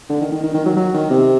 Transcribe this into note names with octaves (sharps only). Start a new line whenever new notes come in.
D3
D#3
D#3
D#3
D#3
F#3
F#3
D#3
C3